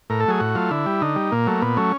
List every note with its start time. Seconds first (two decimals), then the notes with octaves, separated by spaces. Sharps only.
0.10 A2 A#4
0.20 A4
0.25 F#3 A3 G#4
0.40 A2 F#4
0.55 F#3 A3 F4
0.71 D3 E4
0.86 G3
1.01 D3 D#4
1.16 G3
1.31 A#2 A#3
1.47 F#3 A3
1.62 A#2 B3
1.77 F#3 A3 C#4